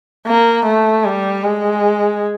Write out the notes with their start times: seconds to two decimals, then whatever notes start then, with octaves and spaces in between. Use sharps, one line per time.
0.27 A#3
0.65 A3
1.05 G3
1.43 G#3